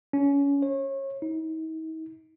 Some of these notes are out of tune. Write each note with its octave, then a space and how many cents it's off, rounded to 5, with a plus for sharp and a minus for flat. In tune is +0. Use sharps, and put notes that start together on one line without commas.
C#4 +25
C#5 -30
D#4 +45